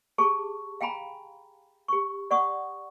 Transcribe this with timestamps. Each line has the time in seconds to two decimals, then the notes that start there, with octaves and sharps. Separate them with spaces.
0.18 G4 G#4 A5 C#6
0.81 F5 G5 G#5 A#5 B5
1.88 G4 C#6
2.31 D5 F#5 C#6 D#6